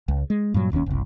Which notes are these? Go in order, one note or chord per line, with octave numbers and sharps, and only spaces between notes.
C#2
G#3
G2 A#2 F#3
E1 D#2 D3 C#4
F#1 C2